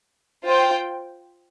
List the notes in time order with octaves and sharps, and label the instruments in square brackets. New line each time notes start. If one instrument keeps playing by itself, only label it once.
[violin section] F4 C5 G5